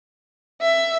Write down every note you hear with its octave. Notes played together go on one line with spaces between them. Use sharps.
E5